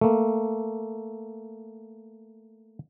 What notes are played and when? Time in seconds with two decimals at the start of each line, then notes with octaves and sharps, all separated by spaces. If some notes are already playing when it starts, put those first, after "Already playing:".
0.01 A3 A#3